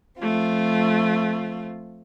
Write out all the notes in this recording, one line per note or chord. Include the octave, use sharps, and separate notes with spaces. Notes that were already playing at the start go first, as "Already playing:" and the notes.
F3 A3 C4 F4